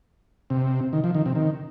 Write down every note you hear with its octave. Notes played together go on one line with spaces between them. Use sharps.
C3
D#3
F3
D#3
C3
D#3